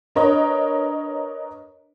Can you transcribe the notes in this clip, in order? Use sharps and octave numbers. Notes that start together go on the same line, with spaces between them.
D4 A#4 B4 C#5 D#5